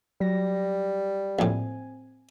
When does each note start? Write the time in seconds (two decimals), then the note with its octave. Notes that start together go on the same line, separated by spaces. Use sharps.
0.21 F#3 G3 A#6
1.39 A#1 A2 C4 G#5